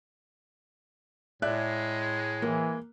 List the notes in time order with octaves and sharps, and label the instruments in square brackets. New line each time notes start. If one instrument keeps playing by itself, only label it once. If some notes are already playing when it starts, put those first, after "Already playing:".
[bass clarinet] A2 [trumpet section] G#3 [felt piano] D5 E5 F#6
[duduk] E3 [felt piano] A#3